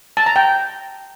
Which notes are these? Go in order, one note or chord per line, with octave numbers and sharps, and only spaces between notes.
A5
A#5
G5